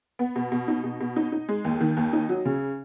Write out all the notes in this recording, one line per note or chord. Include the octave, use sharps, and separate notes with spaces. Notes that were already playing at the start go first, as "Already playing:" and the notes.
B3
B2
B2
D#4
B2
B2
D#4
D#4
G#3
D#2
D#3
D#2
D#4
F#3
C#3